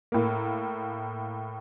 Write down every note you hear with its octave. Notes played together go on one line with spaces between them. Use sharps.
A2 A#3